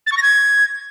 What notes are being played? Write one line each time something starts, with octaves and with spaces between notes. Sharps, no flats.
A6
C#6
A#6
G#6